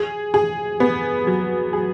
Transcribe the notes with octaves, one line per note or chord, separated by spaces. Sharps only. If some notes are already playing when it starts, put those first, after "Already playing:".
Already playing: G#4
G#4
B3
F#3
G#4